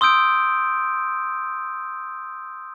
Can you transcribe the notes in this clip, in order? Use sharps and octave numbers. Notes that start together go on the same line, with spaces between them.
C6 D#6 E6 G6 D7